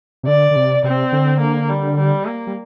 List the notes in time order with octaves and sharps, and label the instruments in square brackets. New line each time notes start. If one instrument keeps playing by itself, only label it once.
[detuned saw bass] C3
[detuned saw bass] D3 [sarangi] D5
[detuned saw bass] D3
C3
[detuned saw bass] C3 [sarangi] C4
[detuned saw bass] D3
[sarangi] A#3
G3
G3
A#3
[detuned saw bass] G3